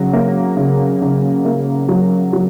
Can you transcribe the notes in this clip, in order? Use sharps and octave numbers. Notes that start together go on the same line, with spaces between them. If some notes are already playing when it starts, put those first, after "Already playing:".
Already playing: C#3 F#3
A#3
C#3
C#3
A#3
F#3
F#3